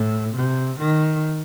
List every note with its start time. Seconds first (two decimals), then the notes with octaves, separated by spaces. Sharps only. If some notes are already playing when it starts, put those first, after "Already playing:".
Already playing: A2
0.36 C3
0.80 D#3